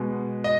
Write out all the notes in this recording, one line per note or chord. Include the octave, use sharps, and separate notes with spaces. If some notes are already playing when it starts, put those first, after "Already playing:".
Already playing: B2 G#3 B3
D#5